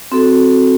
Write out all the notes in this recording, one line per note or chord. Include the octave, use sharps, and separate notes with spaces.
C4 F#4 A4